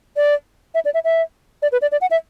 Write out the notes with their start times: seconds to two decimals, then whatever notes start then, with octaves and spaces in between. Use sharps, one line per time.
0.17 D5
0.74 E5
0.85 D5
0.94 E5
1.04 E5
1.62 D5
1.72 B4
1.82 D5
1.92 D5
2.01 F#5
2.11 E5